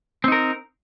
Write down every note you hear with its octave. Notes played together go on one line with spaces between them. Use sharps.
C4 D#4 A#4